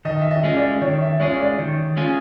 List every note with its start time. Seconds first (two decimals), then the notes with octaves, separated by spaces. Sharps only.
0.05 D#3 D#5
0.21 E5
0.31 D#5
0.43 G#3 C#4 F4 G#4
0.56 D5
0.81 D#3 C#5
1.01 E5
1.20 G#3 C#4 F4 G#4 C#5
1.40 D5
1.59 D#3
1.97 G#3 C#4 F4 G#4